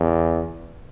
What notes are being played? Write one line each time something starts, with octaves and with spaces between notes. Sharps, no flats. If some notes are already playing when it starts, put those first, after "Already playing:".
Already playing: E2